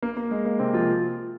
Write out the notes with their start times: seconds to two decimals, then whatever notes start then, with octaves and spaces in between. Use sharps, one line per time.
0.03 A#3
0.17 A#3
0.31 G#3
0.45 A#3
0.59 C3 C4
0.73 F3 F4